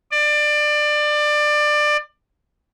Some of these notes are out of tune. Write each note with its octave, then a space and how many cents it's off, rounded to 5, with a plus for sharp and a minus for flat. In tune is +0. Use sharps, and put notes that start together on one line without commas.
D5 +25